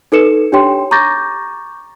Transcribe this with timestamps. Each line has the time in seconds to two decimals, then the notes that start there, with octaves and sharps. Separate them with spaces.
0.12 D#4 A4 B4 C#7 E7
0.52 D4 G4 C#5 G5 C6
0.91 A#5 C#6 D6 G6 A6 A#6